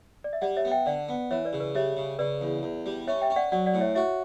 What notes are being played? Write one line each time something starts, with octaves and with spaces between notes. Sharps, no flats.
D5
E5
G3 D5 F#5
C#5 E5
B3
E5 G5
D3 D5 F#5
B3
E3 C#5 E5
B4 D5
C#3
B4 D5
G3 C#5 E5
C#3
C#3 B4 D5
E2
E2
G3
C#4 C#5 E5
E5 G5
C#4
D5 F#5
F#3 D5 F#5
D5 F#5
A2
C#5 E5
F#4 C#5 E5